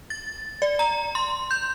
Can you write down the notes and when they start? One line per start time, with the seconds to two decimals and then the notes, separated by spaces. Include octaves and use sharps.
0.10 A6
0.62 D5
0.79 A#5
1.15 C6
1.51 G6